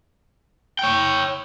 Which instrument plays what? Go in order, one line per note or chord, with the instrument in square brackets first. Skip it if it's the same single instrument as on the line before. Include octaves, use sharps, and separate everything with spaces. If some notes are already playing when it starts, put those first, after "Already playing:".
[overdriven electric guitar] C#5 G5